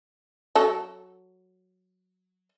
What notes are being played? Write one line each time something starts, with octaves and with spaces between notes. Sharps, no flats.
F#3 A4